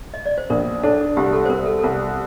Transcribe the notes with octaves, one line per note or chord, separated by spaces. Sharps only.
D#5
D5
C5
A#1 A#4
D4 A4
C2 G4
A4
C5
C2 A#4
A4
A4
C2 A#4